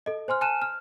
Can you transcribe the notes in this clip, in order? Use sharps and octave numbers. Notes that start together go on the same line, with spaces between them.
A4 D#5
C5 G#5 C6 F6
G#5 A5 F6 F#6 D#7 E7
F6